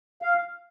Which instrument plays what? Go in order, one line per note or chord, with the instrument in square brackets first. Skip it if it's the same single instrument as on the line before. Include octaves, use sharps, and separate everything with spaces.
[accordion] F5